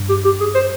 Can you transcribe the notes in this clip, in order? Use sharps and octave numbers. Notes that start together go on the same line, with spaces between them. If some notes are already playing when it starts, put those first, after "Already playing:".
Already playing: G2
G4
G4
G#4
C5